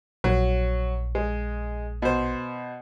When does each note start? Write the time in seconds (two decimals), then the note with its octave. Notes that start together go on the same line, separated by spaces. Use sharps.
0.24 A#1 F#3
1.15 G#3
2.02 B2 C5